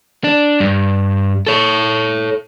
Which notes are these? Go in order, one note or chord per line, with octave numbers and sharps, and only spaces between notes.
D4
G2
A4 C#5